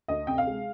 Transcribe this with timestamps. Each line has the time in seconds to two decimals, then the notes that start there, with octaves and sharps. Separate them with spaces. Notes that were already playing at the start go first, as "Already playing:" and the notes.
0.08 D2 D#5
0.27 C3 G5
0.38 F5
0.47 G#3